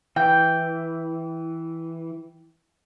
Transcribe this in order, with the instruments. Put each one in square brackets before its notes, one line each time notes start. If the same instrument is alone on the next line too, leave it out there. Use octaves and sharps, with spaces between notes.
[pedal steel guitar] E3 [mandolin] G5